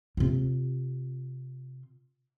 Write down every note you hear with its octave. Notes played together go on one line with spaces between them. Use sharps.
C3 F4